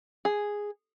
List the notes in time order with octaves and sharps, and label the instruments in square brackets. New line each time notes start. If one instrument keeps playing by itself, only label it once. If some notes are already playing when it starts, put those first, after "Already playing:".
[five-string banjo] G#4